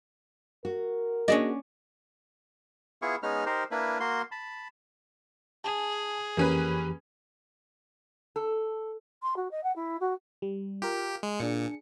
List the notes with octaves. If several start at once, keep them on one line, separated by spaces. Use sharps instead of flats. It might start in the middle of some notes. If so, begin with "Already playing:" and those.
F#4 A#4
A#3 C#4 D4 F#4 G#4 D5 D#5
B3 E4 F4 G#4 C#6
G#3 B3 C#4 D#4 F6
D#4 G4 A#4 C5
A#3 D4 E4 B4
A#3 F#4 C6
A5 B5
G#4 G#5 A5
F2 E3 A#3 C#4 G4 B4
A4
C6
F#4
D#5
F#5
E4
F#4
G3
F4 G4 A#4
G#3
A#2 D4 G#4 C#7